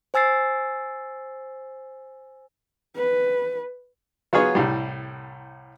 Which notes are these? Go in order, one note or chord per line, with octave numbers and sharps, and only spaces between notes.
C5 G#5 E6 A6 C7
B4
F#3 B3 F4 G#4 C#5
C2 A2 G3